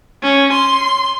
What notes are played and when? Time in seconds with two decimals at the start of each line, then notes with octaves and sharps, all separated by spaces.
0.23 C#4
0.53 C6